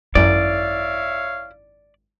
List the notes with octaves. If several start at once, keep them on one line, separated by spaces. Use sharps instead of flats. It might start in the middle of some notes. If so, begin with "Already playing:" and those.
G#1 F#2 E4 C#5 D5 E5 F5